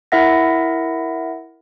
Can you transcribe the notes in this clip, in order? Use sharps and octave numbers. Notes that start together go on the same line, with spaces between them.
E4 A#4 E5 F#5 A#6